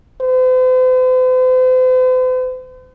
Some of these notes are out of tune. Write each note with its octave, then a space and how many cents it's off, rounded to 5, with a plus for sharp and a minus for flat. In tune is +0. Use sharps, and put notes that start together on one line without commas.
C5 -45